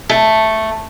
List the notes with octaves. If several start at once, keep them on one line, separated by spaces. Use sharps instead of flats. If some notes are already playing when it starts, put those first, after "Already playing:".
A3